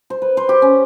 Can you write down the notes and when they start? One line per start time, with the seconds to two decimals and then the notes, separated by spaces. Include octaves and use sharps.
0.10 C5
0.22 B4
0.37 C5
0.49 G4
0.62 C#4